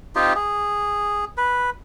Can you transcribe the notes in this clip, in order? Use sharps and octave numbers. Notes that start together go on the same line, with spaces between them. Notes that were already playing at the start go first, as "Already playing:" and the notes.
C4 D#4 F4 G4
G#4
B4